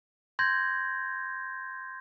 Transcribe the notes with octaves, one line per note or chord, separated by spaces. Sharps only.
C6 G6 G#6 A#6